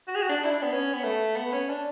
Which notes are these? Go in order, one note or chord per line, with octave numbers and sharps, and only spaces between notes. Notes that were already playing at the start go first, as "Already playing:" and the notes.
F#4
G#4
F#4
D4
E4
D4
B3
C#4
B3
A3
B3
C#4
D4